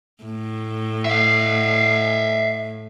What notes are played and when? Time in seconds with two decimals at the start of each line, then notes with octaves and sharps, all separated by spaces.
0.24 A2
1.05 E5 F5